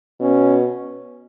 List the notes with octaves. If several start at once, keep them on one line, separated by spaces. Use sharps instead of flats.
B2 C#4